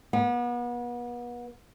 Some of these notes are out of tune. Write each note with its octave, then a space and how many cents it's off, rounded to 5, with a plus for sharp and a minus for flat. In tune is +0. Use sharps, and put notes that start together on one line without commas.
B3 -35